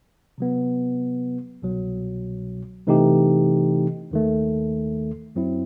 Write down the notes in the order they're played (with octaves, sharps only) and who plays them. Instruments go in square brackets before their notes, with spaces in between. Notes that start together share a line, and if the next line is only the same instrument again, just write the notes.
[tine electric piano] C3 F#3 B3
C2 B2 F#3
C3 E3 A3 D#4 G4
D#2 D#3 A3
F#2 F#3 C4 E4